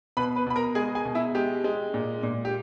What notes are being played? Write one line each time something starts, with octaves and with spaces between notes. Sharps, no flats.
B2 B4 B5
B4 B5
B2 B5
A#4 A#5
G#3 G#4 G#5
G#4 G#5
B2
E4 E5
G#3 G4
G#3
A#2
A#2
G4